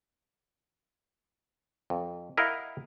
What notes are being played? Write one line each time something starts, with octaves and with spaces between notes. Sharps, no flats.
F2
E4 A#4 D#5 F5 F#5